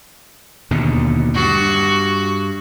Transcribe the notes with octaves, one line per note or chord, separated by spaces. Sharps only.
D#2 B2 D3
G2 F#4